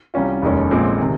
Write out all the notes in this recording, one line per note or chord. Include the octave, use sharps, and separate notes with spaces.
C2 C3 G3 C#4 F4
F1 D#2 D#3 G#3 C#4
A#1 A#2 G#3 C4
C3 D#3